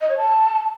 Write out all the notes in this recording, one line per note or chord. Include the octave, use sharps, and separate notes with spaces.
D#5
C#5
A5